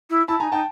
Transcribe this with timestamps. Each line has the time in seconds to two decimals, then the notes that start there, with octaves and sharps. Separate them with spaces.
0.10 E4
0.28 E4 A5 B5
0.40 D#4 G#5 A#5
0.52 D#4 G5 A5